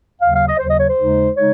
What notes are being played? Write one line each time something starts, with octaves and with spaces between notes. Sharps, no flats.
D#2 C#3 F#3 F5
F5
D#5
D#2 C#3 F#3 C5
D#5
C#5
C5
D#2 C#3 G#3 D#4
C#3 G#3 D#4 C#5